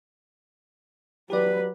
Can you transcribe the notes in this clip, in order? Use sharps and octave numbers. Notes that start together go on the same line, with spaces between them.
F#3 G4 B4 D5